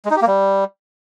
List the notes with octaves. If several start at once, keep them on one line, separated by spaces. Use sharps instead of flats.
G#3
D#4
G4
A#3
G3